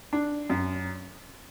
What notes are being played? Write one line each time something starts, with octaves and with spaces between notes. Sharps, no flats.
D4
F#2